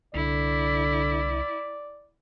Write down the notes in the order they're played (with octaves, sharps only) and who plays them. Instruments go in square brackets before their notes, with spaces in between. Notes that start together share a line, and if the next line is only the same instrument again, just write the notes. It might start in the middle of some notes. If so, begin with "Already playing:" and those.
[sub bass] C2 [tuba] D3 [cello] E4 [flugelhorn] D5